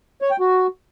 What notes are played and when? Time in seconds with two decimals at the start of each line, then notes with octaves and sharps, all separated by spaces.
0.22 C#5
0.31 G5
0.40 F#4